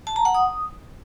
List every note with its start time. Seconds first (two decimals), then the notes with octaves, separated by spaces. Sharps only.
0.07 A5
0.16 A#5
0.25 F#5
0.34 D#6